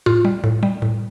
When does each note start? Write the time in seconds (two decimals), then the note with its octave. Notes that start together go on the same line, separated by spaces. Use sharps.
0.06 A2 F4
0.25 G3
0.44 A2
0.63 G3
0.82 A2